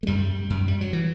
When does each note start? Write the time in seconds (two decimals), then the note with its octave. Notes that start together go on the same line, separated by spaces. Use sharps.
0.03 A3
0.07 F#2 G3
0.50 F#2
0.68 G3
0.81 F#3
0.93 E3